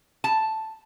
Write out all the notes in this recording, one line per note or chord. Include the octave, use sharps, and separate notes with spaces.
A5